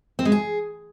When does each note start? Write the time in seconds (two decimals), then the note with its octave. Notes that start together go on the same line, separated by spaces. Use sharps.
0.19 C4
0.25 G#3
0.32 G#4